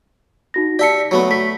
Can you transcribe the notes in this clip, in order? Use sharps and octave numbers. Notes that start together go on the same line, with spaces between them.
D#4 F#4 A#6
G4 D5 E5 A5 C6 C#7
F#3 A3 B3
A3 B6